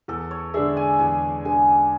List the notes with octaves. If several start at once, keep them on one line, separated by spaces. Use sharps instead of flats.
E2 A4
C#5
D3 G#3 D4 G#4 E5
G#5
E2 G#5
D3 G#3 D4 G#4 G#5